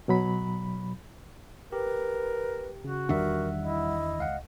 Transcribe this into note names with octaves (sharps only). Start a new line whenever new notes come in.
B2 F#3 B5
G4 A#4 B4
C#3 F#4
E2 D#3 G3 D4 A#4 E5 F#5
E4 D#5
C#2 F5 F#5